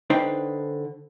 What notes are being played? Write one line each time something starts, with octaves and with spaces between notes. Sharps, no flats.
D3 D4 D#4 B4 C5 G5